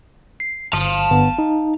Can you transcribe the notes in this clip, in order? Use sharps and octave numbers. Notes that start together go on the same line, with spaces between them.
C7
G1 F5 A5
G1 B3
D#4